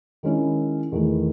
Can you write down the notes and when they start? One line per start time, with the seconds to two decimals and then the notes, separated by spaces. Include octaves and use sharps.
0.23 D#3 G#3 C#4 E4
0.92 E2 D#3 A3 E4